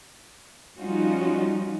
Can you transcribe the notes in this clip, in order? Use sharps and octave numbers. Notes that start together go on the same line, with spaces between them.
F3 G3 C#4 D#4 F4 F#4